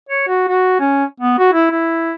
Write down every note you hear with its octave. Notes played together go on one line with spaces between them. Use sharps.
C#5
F#4
F#4
C#4
B3
F#4
E4
E4